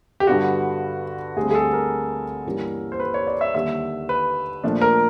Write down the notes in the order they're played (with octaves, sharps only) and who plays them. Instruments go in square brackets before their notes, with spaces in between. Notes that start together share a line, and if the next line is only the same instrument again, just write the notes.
[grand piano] G4
G2 D3 G3 B3 D4 F#4
D2 D3 G3 C4 G#4
G#4
A4
A#4
G2 E3 G3 A#3 C#4
C5
B4
C#5
D5
E5
D#2 D3 G3 E5
B4
A#2 F3 A3 D4
A#4